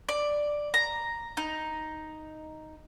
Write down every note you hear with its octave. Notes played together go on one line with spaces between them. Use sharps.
D5
A#5
D#4